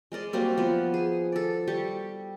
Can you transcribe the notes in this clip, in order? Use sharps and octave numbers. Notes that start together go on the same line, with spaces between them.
G#3 A#4 D5 D#5
F#3 G3 A#3 C4
F3 B3
G#4
A4 D5
G3 G4 C#6